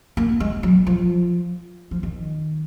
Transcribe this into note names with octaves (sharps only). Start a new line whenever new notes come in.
A#3
G#3
F#3
F3
F3
D#3